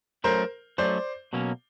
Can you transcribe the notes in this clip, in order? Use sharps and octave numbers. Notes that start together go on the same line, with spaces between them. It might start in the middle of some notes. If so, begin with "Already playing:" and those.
F#3 A3 C#4 A#4 C5
F#3 A3 C#4 C5 D5
B2 F#3 A#3 C#4